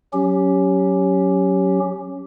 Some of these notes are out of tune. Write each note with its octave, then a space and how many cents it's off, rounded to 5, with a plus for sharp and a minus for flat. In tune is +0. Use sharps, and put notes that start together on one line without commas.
F#3 +0 C#4 +5 G4 +0